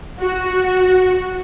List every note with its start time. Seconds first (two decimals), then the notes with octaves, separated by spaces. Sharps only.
0.20 F#4